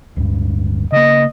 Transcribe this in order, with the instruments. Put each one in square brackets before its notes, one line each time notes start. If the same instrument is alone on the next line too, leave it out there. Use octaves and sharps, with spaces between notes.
[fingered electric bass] D1 D2 G2
[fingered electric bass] C#3 A#3 [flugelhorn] D#5